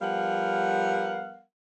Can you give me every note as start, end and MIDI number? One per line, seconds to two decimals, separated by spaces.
0.02 1.42 53
0.02 1.42 55
0.02 1.42 59
0.02 1.42 70
0.02 1.42 77
0.02 1.42 78